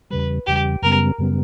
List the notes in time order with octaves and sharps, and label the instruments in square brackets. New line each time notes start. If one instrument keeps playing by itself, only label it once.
[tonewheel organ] E2 C#3 G3 [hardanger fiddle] B4
[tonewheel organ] E2 C#3 G3 [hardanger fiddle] G4
[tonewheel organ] F#2 C#3 G3 B3 [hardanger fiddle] A#4
[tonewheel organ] F#2 C#3 G3 B3